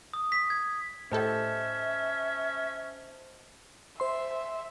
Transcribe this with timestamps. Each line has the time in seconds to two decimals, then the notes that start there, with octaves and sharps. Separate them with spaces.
0.13 D#6
0.32 B6
0.50 G#6
1.12 A2 C#4 G4 A4 C5 D#5 E5 A5
4.00 C5 E5 C6